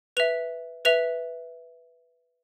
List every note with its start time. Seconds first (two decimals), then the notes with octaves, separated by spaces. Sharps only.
0.17 B4 E5 F7
0.85 B4 E5 F7